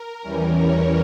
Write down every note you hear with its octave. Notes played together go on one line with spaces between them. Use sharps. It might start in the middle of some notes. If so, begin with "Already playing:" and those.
Already playing: A#4
E2 E3 G3 C#4
C#5